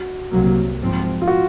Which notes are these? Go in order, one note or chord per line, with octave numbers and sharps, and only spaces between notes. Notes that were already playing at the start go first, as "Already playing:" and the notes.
Already playing: F#4
C2 C3 F#3 A#3
G#2 F3 C4
F4
F#4